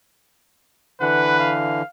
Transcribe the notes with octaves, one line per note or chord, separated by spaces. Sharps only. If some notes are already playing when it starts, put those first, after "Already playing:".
D3 E3 B4 F#5
F5